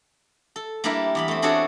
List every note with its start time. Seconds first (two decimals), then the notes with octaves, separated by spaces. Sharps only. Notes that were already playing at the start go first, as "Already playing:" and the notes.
0.56 A4
0.84 G3 A#3 D4 E4 G4 A#4
1.15 E2 G4 B5
1.28 A3 C4
1.42 C4 D4 F#4 G#4 A4 C#5